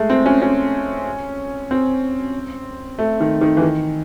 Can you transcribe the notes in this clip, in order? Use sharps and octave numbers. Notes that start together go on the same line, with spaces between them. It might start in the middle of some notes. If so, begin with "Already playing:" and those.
Already playing: G#3 A3
C4
C#4
C#4
C4
A3
D#3
D#3
E3
D#3